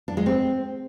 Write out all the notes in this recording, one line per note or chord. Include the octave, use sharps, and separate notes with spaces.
D4
G#3
C4